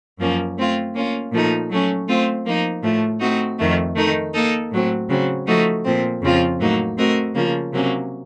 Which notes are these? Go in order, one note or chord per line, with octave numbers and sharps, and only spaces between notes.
F#2 F3 A#3 C#4
A3 C4 F4
A#3 C#4 F4
A#2 F3 A3 D#4
F#3 A3 C#4
A3 C4 F4 C5
F3 A#3 D#4
A2 F3 A3
A3 C4 D#4 F#4
F2 D#3 A3
D#3 A3 D#4
A#3 D#4 A4
A2 F#3 C4
C#3 F#3 C4
F3 A3 D#4 F#4
A#2 F3 C4
F2 C#3 F3 C4 F4
A2 F#3 A#3 D#4
A3 C4 F#4 A#4 D#5
C#3 F3 A#3
C3 F#3 A#3 C#4